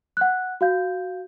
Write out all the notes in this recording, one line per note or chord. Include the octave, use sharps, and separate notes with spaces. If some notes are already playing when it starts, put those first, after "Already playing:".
F#5 F#6
F#4 F5 G6